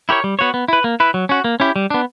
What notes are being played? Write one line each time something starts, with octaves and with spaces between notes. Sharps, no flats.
E4 G4 A#4 C#5
G3
B3 F#4 C#5
B3
E4 B4
A#3
E4 B4
F#3
C#4 F#4
A#3
C#4 E4 G4
G3
B3 D4